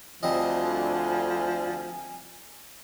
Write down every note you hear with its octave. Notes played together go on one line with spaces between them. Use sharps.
D2 F3 G3 C4 D#5 G#5